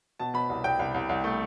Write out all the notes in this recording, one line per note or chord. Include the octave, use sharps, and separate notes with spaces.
B2 A5
B2 B5
C2
C2 G5
C2
C2
C2
A3